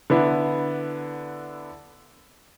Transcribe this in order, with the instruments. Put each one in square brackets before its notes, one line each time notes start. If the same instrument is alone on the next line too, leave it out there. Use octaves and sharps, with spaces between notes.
[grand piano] D3 B3 E4